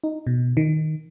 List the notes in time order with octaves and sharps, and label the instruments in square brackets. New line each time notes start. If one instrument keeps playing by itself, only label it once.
[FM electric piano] D#4
B2
D#3